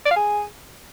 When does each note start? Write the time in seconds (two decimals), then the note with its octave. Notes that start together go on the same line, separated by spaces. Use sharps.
0.05 D5
0.11 F5
0.16 G#4